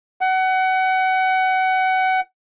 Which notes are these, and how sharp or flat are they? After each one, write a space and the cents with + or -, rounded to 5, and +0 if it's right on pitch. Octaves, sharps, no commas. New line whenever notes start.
F#5 +25